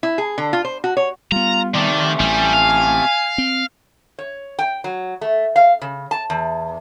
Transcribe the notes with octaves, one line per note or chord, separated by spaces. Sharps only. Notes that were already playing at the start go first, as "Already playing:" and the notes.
E4
G#4
D3
F4
C5
F#4
C#5
G3 B3 F4 A#5
C3 D#3 A3 D5
A1 G3 G#5
F5
C4
C#5
G5
F#3
A3
F5
C#3
A5
E2